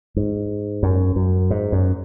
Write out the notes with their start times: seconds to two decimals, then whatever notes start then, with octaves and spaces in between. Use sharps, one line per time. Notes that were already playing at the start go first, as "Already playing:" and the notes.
0.17 G#2
0.83 F#2
1.16 F#2
1.50 G#2
1.72 F#2